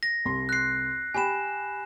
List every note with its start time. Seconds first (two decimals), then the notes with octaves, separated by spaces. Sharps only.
0.03 A#6
0.25 C2 C6
0.49 F#6 C7
1.14 G4 G5 G#5 B5 E7